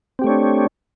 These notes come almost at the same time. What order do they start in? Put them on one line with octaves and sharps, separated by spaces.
C4 G4 A3 C#5 D4